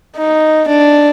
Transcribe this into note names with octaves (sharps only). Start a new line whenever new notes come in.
D#4
D4